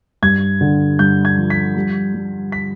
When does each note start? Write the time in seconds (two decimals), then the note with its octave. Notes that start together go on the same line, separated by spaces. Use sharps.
0.22 G2 G#6
0.61 D3
0.99 G2 G6
1.25 G#6
1.38 F3
1.50 B6
1.76 G3
2.14 G3
2.52 B6